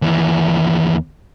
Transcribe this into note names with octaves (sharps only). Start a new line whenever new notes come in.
D#2 E3